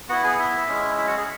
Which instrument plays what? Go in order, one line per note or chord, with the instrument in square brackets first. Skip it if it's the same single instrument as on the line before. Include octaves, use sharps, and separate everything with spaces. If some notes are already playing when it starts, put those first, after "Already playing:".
[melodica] B3 E4 F#4 F#5
G#4 G#5
E4 E5
G#3 C#4 E4
E4 E5
F#4 F#5
G#4